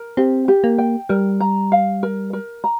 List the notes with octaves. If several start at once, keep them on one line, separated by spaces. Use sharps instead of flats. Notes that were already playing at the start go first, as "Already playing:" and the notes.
Already playing: A#4
C4 G4
G4
A#3
G5
G3 A#4
A#5
F5
A#4
A#4
A#5